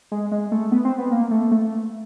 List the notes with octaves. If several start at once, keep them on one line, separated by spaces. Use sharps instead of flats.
G#3
G#3
A3
B3
C4
B3
A#3
A3
A3